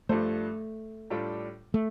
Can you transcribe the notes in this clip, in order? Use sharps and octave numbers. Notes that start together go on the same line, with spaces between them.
G2 F3 A3 D4 A4 C5
A2 G3 D4 F4 A4
A3